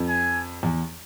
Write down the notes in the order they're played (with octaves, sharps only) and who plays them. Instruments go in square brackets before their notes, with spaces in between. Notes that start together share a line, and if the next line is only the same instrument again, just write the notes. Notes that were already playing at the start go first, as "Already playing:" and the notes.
Already playing: [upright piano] F2
[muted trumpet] G#5
[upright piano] E2